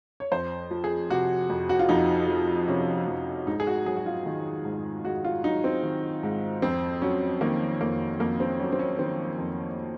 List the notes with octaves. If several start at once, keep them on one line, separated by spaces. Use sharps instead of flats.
C#5
F2 C5
F3
G#4
C3 F#4
F2
F#4
F4
F2 D#4
F3
C3 C#4
F2
G#2 D#4
G#4
F#4
F#3 G#4
F#4
F4
D#3
G#2
G#2 F#4
F4
F#3 D#4
C4
D#3
G#2
F2 C4
F#3 C#4
D#3 A#3
F2 A#3
F2 A#3
C4
F#3 C#4
C4
C#4
D#3 C4
F2